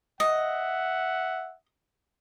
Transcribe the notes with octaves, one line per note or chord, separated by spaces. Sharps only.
D#5 E5 F#5